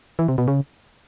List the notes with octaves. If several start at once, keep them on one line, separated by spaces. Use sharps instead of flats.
E3
C3
B2
C#3